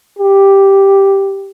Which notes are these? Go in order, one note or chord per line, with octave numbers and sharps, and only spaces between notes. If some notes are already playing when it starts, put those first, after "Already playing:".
G4